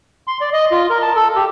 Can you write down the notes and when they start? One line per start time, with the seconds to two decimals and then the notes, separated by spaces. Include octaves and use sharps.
0.27 C6
0.41 D5
0.53 D#5
0.72 F4
0.90 A#4
1.02 A5
1.16 A4
1.36 G4